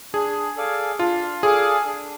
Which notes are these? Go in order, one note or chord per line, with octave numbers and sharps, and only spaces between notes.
D4 G#4
A4 D5 F5 G#5
D4 F4
G#4 A4 D5 F5 G#5
D4